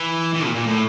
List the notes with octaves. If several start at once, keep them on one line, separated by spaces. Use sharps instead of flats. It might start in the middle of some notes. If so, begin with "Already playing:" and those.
Already playing: E3
E3
A#2
A#2
A2